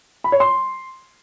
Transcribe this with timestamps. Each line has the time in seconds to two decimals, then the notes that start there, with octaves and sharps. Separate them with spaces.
0.24 B5
0.32 C#5
0.40 C6